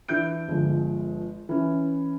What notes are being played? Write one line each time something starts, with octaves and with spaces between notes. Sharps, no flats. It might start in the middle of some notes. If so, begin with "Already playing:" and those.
E3 D4 E5 G6 D7
G1 F3 G#3
E3 C#4